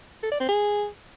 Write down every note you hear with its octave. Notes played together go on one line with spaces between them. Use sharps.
A4
D5
C4
G#4